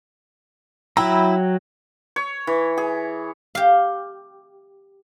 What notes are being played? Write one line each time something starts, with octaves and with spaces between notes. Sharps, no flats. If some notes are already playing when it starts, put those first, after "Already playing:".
F#3 E4 G5 A#5
C#5
E3
G#4
G4 F5